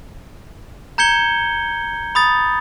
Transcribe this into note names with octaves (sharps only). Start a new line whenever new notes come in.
A#5 G6 G#6 C#7 G7
B5 D#6 A6